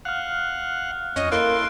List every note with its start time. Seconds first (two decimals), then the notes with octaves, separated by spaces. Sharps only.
0.05 F5 F#5 F6 F#6
1.16 F2 C#4 C#5 D#5
1.32 A#3 E4 A4 C6 F#6 D7